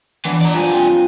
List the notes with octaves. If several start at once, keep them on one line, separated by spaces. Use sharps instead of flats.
E3 B3 D4
D5 A#5
G2 F3 G#5
C4